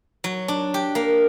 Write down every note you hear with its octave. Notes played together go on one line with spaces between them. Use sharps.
F#3
D4
G4
A#3